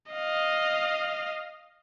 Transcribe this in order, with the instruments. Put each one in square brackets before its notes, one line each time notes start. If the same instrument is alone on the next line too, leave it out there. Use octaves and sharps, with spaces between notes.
[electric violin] D#5 F5